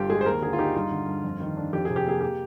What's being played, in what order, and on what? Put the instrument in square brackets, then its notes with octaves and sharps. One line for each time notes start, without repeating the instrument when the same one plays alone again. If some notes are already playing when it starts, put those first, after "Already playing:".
Already playing: [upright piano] G1 G2 F4 G4
G#3 G#4
C5
D#2 A#4
D3 G#4
F4
D#4 G4
G2 F4
D3
G2
F2
D#3
D4
F2 G4
C3 G#4
G4
A#3 G#4
G4